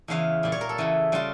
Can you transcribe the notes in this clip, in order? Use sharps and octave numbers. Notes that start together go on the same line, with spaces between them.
E2 C#3 E3 F5
A#2 G3
C#5
A#4
A4
E2 C#3 E3
C#3 G3 F4